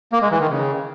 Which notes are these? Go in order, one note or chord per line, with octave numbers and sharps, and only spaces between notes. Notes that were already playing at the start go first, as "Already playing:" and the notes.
A#3
G#3
E3
D#3
C#3